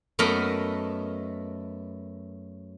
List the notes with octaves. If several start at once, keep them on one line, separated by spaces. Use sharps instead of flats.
F#2 A3 B3 A#4 D#5 B5